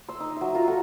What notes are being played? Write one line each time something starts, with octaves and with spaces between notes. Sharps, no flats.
C6 E6
D#4
F#3 E5
F4 A#5
F#4 A4 F#5